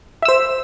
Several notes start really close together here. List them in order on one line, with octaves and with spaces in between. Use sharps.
E5 E6 C5